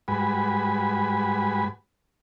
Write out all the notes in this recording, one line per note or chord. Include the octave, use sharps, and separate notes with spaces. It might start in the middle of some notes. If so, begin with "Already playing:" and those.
G#2 G3 F#4 B4 G#5 B5